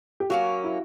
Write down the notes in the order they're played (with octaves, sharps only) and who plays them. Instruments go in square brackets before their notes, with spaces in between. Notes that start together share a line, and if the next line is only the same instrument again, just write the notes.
[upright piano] G4
[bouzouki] F#3 A#3 C#4 [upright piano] F#4
[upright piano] E4